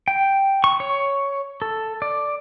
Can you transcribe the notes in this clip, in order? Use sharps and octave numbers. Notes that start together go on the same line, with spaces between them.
G5
C#6
C#5
A4
D5